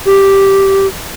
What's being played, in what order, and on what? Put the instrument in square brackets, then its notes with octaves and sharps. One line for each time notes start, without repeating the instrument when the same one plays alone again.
[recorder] G4